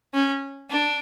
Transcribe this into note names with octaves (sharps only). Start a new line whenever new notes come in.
C#4
D4